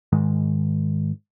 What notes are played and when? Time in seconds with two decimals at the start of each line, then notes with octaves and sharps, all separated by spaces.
0.12 G#2 D#3 G#3